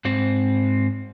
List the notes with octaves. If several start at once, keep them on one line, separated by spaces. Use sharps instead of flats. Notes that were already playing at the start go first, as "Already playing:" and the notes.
G#2 C4